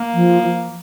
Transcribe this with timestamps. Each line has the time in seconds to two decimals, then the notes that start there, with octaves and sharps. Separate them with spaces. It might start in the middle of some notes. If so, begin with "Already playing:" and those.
Already playing: A#3
0.13 F3
0.42 F3